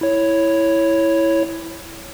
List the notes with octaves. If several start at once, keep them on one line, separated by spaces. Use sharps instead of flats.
E4 C#5